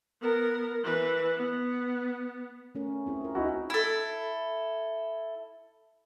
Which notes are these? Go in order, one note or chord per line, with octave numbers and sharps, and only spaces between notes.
B3 A#4
E3 B4
B3
A3 C#4 A#4
C4 E4 G#4
F4 A#4
D#4 E4 F#4
E4 A4